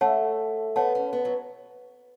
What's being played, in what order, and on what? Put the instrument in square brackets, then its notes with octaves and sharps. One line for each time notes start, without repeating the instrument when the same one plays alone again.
[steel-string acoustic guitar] A3 [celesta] C#5 F#5 A5
[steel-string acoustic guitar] B3 [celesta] C#5 F#5 A5
[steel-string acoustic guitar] C#4
B3
F#3